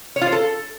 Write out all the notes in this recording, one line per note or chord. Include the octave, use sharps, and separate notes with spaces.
C#5
F4
C5
A4